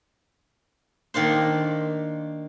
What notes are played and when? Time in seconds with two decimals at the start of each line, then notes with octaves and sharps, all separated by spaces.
1.14 D#3 A#3 D4 C5